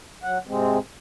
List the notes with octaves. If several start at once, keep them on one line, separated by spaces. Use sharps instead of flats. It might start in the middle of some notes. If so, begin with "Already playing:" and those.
F#3 F#5
G#2 C3 G#3 C4